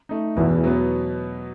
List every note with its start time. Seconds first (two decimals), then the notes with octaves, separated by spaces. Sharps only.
0.09 A3 D#4
0.37 E2 B2 E3
0.64 F#3 B3